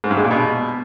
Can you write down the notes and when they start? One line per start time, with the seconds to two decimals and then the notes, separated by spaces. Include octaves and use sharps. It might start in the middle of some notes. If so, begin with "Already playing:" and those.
0.04 G#2
0.11 G2
0.17 G#3
0.24 A#2
0.31 B2